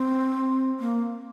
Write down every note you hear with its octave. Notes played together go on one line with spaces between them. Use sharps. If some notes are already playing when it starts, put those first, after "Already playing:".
Already playing: C4
A#3